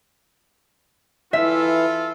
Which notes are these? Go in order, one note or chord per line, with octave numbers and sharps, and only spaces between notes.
E3 F4 A4 E5